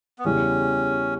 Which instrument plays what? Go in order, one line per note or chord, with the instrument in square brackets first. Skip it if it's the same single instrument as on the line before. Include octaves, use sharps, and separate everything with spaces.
[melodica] B3
[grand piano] E2 C#3 E3 G3 [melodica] C#4